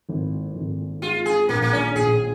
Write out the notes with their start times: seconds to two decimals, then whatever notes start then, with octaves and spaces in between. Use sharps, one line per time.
0.09 G#1
0.55 G#1
1.02 G#3 F4
1.26 G#4
1.49 A#1 A#3
1.62 A#3
1.73 C#4
1.95 A#1 G#4